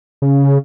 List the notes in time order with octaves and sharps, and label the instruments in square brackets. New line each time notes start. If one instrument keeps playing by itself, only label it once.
[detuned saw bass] C#3